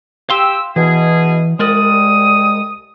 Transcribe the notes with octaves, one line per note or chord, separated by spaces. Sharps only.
G4 F5 C6 E6
B2 E3 G#4
C2 G#3 A#4 D5 D#6